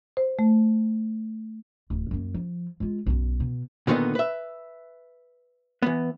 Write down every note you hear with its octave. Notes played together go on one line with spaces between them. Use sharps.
C5
A3
D1
F#2 A#3
F3
G#3 F4
B1 F#2
B2
A#2 D3 D#3 A#3 B3 D#4
B4 E5
E3 B3